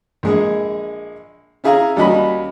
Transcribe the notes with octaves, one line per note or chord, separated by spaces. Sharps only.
A#1 G#3 G#4
C#4 E4 G#4 F5 G#5 A#5
D#2 G3 C#4 F#4 D#5 B5